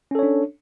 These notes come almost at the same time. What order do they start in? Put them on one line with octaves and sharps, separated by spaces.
C#4 A4 C#5 D4